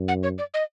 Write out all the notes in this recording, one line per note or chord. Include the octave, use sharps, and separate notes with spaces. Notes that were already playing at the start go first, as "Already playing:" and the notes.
Already playing: F#2
F#5
C#5
D5
D#5